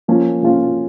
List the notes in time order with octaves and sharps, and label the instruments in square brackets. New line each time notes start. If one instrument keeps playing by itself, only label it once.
[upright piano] F3 A#3 C#4 F4
F3 A#3 C#4 F4